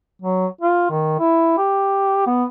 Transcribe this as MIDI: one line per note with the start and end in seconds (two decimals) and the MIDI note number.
0.22 0.47 54
0.61 0.87 65
0.90 1.16 51
1.19 1.54 64
1.58 2.24 67
2.27 2.44 59